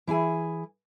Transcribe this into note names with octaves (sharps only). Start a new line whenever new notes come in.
E3 E4 G#4 G#5